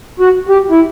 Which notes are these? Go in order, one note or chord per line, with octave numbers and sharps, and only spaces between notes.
F#4
G4
E4